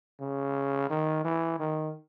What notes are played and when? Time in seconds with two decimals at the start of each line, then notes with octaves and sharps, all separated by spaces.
0.20 C#3
0.90 D#3
1.24 E3
1.60 D#3